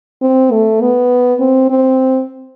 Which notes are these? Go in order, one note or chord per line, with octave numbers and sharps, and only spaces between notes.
C4
A3
B3
C4
C4